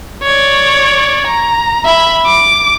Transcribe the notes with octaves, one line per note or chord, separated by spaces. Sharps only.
C#5 D5
A#5
E5 B5
D6